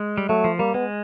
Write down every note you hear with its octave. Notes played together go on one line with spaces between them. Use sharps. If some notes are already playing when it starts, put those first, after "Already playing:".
Already playing: G#3
G3
F#3 A3
F3
G3 A#3
G#3 B3